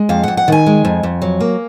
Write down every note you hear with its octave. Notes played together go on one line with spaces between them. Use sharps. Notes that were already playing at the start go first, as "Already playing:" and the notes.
Already playing: G#3
F2 F5
F2 F#5
F#5
D#3 G#5
G#3
F2
F2
F#3
A#3